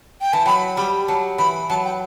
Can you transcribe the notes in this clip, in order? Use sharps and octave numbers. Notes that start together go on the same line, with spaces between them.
G5
E3 A5
F#3 B5
G3 B5
F#3 A5
E3 B5
F#3 A5
G5